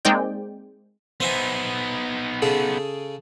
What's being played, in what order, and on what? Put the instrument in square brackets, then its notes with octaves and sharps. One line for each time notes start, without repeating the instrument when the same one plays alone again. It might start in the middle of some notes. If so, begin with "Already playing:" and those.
[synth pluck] G#3 A#3 C4 D#4 D5 G5
[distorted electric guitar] B3 D#4 [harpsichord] C5 E5 G#5
[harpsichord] C#3 G#4 A4